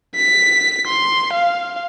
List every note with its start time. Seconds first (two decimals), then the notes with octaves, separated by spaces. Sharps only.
0.16 B6
0.87 C6
1.33 F5